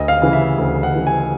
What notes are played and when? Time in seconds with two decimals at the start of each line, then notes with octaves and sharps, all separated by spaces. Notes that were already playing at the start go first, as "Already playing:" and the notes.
Already playing: D2 D#5
0.08 F5
0.22 C#3 E3
0.33 E5
0.58 D2
0.83 F#5
0.94 C#3 E3
1.07 G#5